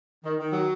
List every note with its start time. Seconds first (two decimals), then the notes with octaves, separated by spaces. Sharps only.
0.25 D#3
0.39 D#3
0.53 F#3